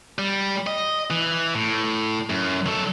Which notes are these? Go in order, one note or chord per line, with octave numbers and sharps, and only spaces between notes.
G3
D#5
E3
A2
F#2
F#3 A4